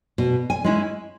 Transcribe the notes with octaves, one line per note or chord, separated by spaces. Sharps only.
B2
G#5
G#3 C#4 E4